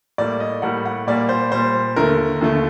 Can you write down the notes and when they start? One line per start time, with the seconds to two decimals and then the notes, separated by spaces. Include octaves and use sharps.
0.18 A2 G3 A#3 D5
0.40 D#5
0.62 A2 G3 A#3 F#5
0.85 F#5
1.07 A#2 G3 A#3 D5
1.29 C5
1.52 A#2 G3 A#3 C5
1.96 D#2 D3 A3 A#4
2.41 D#2 D3 A3